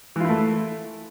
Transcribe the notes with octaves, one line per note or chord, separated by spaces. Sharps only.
E3 A3 E4 F4